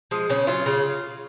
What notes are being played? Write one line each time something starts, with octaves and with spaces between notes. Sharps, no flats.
F3 G#3
C#3 C#4
F#3 F4
C#3